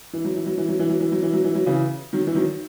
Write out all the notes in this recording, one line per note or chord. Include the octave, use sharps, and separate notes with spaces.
E3
F#3
E3
F#3
E3
F#3
E3
F#3
E3
F#3
E3
F#3
E3
F#3
C#3 E3
D#3 F#3
E3
D#3 F#3